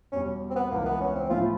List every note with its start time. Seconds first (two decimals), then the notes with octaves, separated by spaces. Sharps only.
0.12 E2 B2 G3 C#4
0.50 C4
0.56 B3
0.71 C#2 C#3 E3 A#3
0.85 B3
1.00 C#4
1.15 C4
1.29 A2 F3 A3 C#4 E4 F4